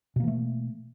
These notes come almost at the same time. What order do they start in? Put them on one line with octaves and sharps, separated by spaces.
B2 A#3 E3 A3